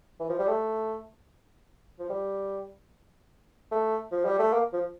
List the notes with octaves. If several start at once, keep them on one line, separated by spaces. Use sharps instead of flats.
E3
F3
G3
A3
F3
G3
A3
F3
G3
A3
A#3
F3